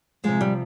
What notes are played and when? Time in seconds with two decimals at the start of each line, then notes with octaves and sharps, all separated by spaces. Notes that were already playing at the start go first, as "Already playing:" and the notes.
0.24 C3 F3 G#3
0.41 G3